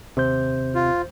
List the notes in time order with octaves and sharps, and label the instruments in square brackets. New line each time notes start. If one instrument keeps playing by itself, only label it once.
[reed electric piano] D#2 C5 G6 [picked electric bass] C3
[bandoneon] F4